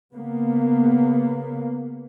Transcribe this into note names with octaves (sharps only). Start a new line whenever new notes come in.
C#3 A#3 B3